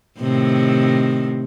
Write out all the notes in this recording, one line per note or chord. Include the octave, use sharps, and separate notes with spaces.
A2 C3 D#3